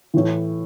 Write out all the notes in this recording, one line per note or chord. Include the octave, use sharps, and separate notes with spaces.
A2 E3